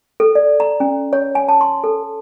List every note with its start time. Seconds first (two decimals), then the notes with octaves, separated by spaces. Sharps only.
0.20 A4
0.35 D5
0.60 A#5
0.80 C#4
1.13 C#5
1.35 G#5
1.48 A5
1.61 C6
1.84 A4